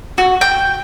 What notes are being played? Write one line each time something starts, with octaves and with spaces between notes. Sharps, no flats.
F#4
G5